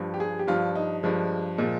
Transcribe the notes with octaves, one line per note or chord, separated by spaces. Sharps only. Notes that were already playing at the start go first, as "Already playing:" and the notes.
Already playing: G2 F3
G4
G#4
G4
G2 F3 F4
D#4
G2 F3 G#3
A#2 F3 G#3